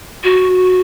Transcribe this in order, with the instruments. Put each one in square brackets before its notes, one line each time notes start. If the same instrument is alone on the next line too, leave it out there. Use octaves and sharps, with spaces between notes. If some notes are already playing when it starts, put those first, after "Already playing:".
[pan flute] F#4